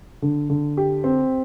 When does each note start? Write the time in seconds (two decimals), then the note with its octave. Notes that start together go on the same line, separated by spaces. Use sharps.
0.22 D3
0.50 D3
0.77 G4
1.04 C4